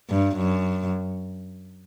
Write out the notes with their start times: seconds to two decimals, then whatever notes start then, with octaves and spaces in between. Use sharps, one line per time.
0.10 G2
0.37 F#2